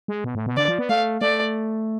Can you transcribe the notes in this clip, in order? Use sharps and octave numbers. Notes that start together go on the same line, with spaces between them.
G#3
B2
A2
B2
D3 D5
F3
B3
A3 F5
A3 D5